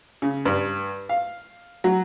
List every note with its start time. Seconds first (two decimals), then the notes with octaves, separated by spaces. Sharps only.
0.22 C#3
0.45 G2
1.09 F5
1.84 F#3